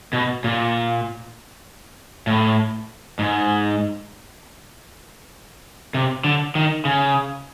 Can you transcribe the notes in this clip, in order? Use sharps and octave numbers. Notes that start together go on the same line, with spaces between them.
B2
A#2
A2
G#2
C3
D3
D#3
C#3